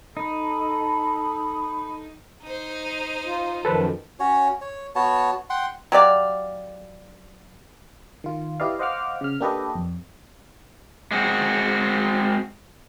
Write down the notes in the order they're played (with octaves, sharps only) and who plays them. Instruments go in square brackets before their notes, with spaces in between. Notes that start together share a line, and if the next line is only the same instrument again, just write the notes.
[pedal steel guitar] D#4 [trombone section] A4 [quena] B5
[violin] D#4 C5
[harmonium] F4
[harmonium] F#2 D#3 F3 [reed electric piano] A4 B4 C5
[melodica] C#4 F#4 C#5
C#5
B3 F#4 C#5 A5
F#5 G5 C6
[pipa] F#3 G4 D5 F5
[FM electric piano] D#3 F4
E4 G4 B4 D5 D#5 F5
C5 D#5 F5 F#5 D6 F6
C#3 F6
A#3 D4 G4 A4 B4 D#5
F2
[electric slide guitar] G#3 C4 F#4